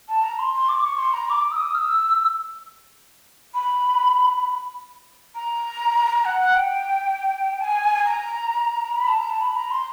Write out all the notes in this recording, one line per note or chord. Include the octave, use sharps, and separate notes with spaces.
A5
A#5
C6
C6
D6
C#6
C6
A#5
D6
E6
D#6
F6
E6
B5
A#5
F#5
F#5
G5
A5
G#5
A#5
B5
A5
A#5
A5
B5
A#5
C6